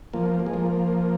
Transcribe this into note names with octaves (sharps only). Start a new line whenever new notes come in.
F3 A#3
A#3
G#3
F3 A#3